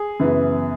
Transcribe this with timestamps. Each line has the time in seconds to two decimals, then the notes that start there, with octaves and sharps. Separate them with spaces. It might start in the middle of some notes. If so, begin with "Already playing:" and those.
Already playing: G#4
0.20 F#2 C#3 E3 B3